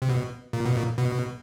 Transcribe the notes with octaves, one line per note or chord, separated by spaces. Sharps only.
C3
B2
A#2
B2
A#2
B2